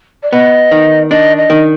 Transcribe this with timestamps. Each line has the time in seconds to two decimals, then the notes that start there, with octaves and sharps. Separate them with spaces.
0.23 D5
0.32 B3 D#5
0.71 D#3
1.10 D4 D#5
1.37 D#5
1.50 D#3